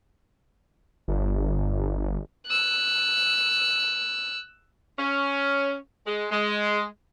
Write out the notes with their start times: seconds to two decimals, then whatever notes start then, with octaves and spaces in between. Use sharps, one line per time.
1.08 G1
2.47 E6 F#6
4.99 C#4
6.06 G#3
6.31 G#3